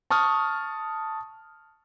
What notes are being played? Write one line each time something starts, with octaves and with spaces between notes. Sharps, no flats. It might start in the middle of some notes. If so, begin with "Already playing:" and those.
A5 C#6 D#6 F6